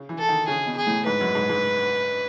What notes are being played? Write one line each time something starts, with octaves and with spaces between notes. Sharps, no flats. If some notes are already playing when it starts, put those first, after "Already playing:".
Already playing: C#3
E3
A4
D#3
C#3 G#4
B2
G#4
A2
G#2 B4
F#2
G#2
G#2